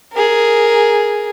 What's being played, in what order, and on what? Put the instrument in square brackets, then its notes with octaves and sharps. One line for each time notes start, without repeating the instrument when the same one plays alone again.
[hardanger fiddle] G#4 A#4